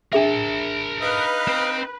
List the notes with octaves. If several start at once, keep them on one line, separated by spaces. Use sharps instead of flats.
D4 G#4 A#4 E5 A5
D#4 B4 D#5 F5
C4